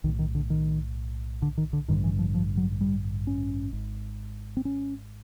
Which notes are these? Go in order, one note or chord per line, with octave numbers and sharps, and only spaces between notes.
B1 A2 D#3
D#3
D3
D#3
D3
D#3
D3
A1 G2 D3 D#3
E3
F3
F3
F#3
G3
C#4
G#1 G#2
C4
C#4